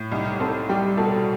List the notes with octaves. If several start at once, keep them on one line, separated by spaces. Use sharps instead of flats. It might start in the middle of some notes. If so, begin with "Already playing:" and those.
Already playing: A2
C2 D#4 D#5
C4 A4 A5
G3 G4 G5
B2 A4 A5